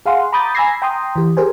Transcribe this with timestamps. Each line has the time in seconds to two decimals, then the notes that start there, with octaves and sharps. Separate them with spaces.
0.06 G#4 F5 F#5 C6
0.32 A#5 B5 D6 D#6 G6 A6
0.55 G#5 B5 E6 G#6 A#6 C7
0.82 G5 A#5 C6 D#6
1.16 E3 G4
1.37 G4 G#4 A#4 C5 G#5